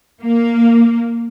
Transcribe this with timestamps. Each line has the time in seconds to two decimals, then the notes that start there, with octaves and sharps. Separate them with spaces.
0.22 A#3